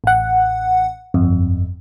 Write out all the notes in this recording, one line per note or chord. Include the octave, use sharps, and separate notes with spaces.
A1 F#5
G1 F2